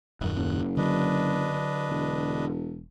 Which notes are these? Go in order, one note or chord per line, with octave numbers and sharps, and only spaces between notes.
D#1 F#2 D#3 F#6
F#1
D3 F#3 D4 B4 D#5
E1